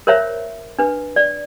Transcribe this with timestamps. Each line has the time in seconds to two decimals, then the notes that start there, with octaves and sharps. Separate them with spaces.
0.07 A#4 C5 C#5 E5 A#5
0.79 D4 B4
1.16 D5